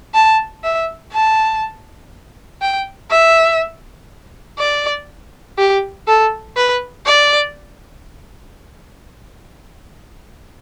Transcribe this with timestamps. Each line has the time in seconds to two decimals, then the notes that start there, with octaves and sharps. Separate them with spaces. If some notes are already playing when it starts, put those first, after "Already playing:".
0.14 A5
0.64 E5
1.13 A5
2.61 G5
3.11 E5
4.59 D5
5.58 G4
6.07 A4
6.57 B4
7.06 D5